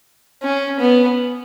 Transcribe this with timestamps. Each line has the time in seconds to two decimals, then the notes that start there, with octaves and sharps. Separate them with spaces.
0.43 C#4
0.80 B3